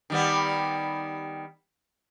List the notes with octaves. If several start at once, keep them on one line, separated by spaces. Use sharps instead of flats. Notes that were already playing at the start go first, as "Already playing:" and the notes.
D#3 G3 B3